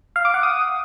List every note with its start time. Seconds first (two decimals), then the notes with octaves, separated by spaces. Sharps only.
0.16 F5
0.25 D6
0.34 F#5
0.43 D#6